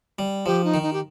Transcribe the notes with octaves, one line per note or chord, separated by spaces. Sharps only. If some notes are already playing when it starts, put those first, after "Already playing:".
G3
F3 G4
D#4
D#3
D#4
G4